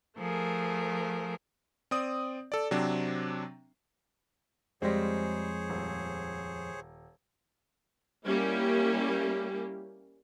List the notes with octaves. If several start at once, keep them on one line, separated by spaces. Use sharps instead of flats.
F3 A3 G#4 A#4
C4 D5 D#6
A4 D5
C3 F#3 C4 D4
F2 G3 G#3 C4 G#4 C5 C#5
D#1
G3 A#3 C#4 E4 G4